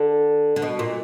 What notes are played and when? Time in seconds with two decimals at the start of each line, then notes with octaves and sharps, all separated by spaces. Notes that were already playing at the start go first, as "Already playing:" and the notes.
Already playing: D3
0.56 D3
0.62 B2
0.79 A#2